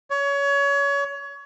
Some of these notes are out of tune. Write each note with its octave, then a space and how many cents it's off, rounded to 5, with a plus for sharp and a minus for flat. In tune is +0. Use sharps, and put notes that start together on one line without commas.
C#5 +25